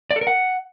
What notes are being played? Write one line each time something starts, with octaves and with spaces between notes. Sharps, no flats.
D5
A4
A#4
F#5